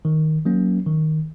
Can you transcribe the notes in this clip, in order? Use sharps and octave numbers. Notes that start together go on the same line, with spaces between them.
D#3
F#3 A#3 C#4
D#3